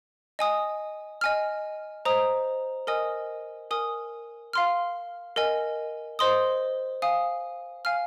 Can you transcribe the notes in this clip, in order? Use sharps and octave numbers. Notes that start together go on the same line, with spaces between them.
D#5 G#5 D#6
D#5 G#5 F6
C5 D#5 A#5 D#6
A#4 D#5 G#5 D#6
A#4 G#5 D#6
F5 C6 F6
A#4 D#5 G#5
C5 D#5 C6 D#6
F5 G#5 D#6
F5 G#5 F6